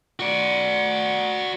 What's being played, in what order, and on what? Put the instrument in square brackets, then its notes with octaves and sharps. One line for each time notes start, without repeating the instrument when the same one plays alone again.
[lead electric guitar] F#4 D5